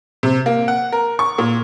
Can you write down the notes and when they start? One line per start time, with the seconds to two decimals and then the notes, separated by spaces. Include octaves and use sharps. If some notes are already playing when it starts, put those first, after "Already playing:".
0.23 C3
0.46 A#3
0.68 F#5
0.92 A#4
1.19 C#6
1.38 A#2